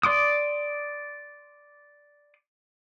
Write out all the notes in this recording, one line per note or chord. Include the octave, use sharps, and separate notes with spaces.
D5 C6 D6 D#6